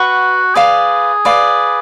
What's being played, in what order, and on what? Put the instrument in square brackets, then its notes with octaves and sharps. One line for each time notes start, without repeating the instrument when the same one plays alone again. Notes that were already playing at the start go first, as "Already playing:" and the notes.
Already playing: [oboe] F#4 [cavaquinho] B4 F#5 C#6
[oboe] G#4 [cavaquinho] B4 D5 F5
[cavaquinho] B4 D5 F5